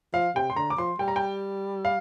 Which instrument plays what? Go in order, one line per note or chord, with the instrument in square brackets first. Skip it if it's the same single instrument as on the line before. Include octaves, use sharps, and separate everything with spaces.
[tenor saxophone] F3 [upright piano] F5
[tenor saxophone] C3 [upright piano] G5
[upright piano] C6
[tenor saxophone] D3 [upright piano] A#5
[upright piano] D6
[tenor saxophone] F3 [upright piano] C6
[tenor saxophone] G3 [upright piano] G5
[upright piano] A#5
G5
F5